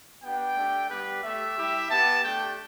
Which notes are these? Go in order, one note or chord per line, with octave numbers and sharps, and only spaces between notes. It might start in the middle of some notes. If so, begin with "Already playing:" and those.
B3 D4 G4 G5
A3 D4 G4
G3 B3 G4 B4
A3 G4 E5
G3 E4 G4
B3 G4 A5
A3 D4 G4 G5